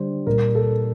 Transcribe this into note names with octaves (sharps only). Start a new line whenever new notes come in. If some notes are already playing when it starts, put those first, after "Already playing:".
Already playing: D3 G3 C5
A#2 G3 A#4
A4